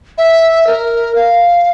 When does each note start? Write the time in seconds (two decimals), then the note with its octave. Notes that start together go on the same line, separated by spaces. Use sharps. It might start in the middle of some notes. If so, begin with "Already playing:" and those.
0.18 E5
0.67 A#4
1.15 F5